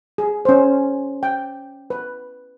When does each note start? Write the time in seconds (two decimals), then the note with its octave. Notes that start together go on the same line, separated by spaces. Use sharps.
0.18 G#4
0.45 C#4 C5
1.23 G5
1.90 B4